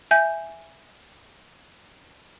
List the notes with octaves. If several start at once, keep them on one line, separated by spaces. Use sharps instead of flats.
E5 G#5 G6